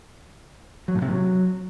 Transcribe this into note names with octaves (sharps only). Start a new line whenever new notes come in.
F#3
A2
C3
F#3